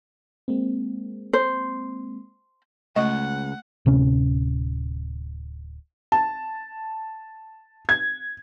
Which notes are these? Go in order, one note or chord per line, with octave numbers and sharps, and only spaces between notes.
G#3 A#3 C4
C5
C#2 A3 D#5 F#5 C#6
D1 C3 C#4
A5
G#6